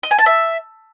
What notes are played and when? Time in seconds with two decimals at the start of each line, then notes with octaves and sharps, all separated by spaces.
0.03 D#5
0.11 G#5
0.19 A5
0.26 E5